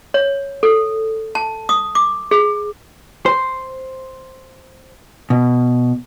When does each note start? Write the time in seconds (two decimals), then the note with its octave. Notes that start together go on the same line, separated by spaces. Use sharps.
0.14 C#5
0.63 A4
1.35 A5
1.69 D#6
1.95 D6
2.31 G#4
3.26 C5
5.30 B2